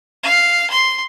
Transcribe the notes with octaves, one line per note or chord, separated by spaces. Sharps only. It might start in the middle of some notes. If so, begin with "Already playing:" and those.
F5
C6